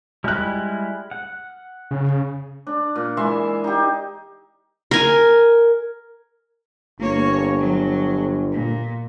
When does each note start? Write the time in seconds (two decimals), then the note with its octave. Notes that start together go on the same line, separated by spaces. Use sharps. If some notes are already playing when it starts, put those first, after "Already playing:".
0.24 G3 G#3 E4 F6 F#6
1.11 F#5
1.91 C#3
2.67 D4
2.95 A#2
3.17 E3 G#3 E5 C6
3.64 D#4 G4
4.91 A#4 G#5
6.99 G1 A#3 C#5
7.59 F#3
8.52 A#2